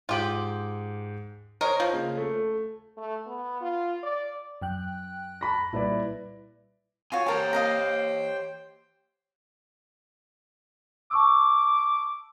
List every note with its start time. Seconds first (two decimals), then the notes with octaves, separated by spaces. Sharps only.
0.09 G#2 F4 G4 D6 F#7
1.61 A#4 C5 C#5 D#5
1.80 F3
1.93 C#3 A#3
2.17 A3
2.97 A3
3.26 B3
3.61 F4
4.03 D5
4.62 F#2 G5 F#6
5.41 A5 B5 A#6
5.73 A#2 G3 E4 B4 D5
7.12 F4 F#4 C#5 G#5
7.26 G4 A#4 C5 C#5 G5 A5
7.53 D#5 F5 A#5
11.11 A5 C#6 D6 E6